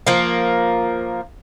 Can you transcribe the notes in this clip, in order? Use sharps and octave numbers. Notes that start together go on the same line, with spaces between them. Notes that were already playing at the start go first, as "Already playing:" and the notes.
F3 A#3